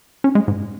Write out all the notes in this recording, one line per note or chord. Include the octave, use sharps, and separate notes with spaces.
C#4
G#3
G#2